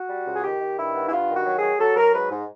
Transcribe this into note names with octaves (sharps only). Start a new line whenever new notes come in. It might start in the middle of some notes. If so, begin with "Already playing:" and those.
Already playing: F#4
G3
C#2
G#4
D#3 G4
D#3
G2 E4
B3
E4
G2 F4
D#3
F#4
F#3
G#4
F#3
F#3 A4
F#3 A#4
G#2 B4
G#2